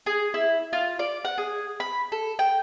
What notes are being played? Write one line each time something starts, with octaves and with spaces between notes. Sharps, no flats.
G#4
E4
F4
D5
F#5
G#4
B5
A4
G5